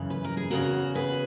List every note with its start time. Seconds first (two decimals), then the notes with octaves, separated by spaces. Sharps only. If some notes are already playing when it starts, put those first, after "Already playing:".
Already playing: F#2 C#3 E3
0.10 B4
0.24 A#4
0.37 G#4
0.50 E2 C#3 E3 F#4 A#4
0.95 G#4 B4